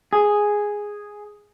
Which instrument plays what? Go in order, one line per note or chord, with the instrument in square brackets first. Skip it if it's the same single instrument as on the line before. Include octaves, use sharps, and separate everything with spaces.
[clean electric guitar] G#4